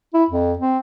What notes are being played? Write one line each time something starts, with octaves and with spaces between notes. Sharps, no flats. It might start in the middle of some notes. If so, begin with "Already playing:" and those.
E4
F2
C4